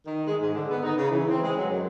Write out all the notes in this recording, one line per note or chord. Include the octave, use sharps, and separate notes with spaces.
D#3
G#3
G#2
D3
B3
D#4
C#3
E3
C4
G#3
F#3
F#2